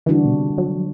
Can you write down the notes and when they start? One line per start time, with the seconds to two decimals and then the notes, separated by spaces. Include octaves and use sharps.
0.06 D3 E3 G3 D4 F#4
0.25 B2
0.32 C3
0.58 F#3